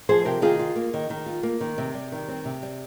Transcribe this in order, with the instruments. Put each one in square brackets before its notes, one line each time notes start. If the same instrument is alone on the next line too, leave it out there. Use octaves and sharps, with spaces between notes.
[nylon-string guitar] F3 G#4 C5
C3 G4 A#4
D#3 F4 G#4
F4
A#3
D#3
D#3
F4
A#3
D#3
C3
G3
D#3
C4
C3
G3